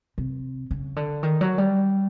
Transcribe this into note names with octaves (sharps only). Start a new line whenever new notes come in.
C3
C#3
D3
D#3
F#3
G3